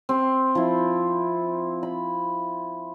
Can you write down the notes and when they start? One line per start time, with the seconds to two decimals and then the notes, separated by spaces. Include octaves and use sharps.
0.09 C4
0.55 F3 E4
1.83 B5